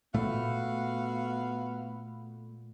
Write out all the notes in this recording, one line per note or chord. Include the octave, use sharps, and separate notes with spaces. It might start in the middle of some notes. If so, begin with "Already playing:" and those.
A#2 A3 B3 F#4 F5